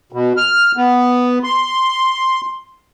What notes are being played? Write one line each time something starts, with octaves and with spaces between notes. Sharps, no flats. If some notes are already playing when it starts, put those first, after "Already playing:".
B2
F6
B3
C6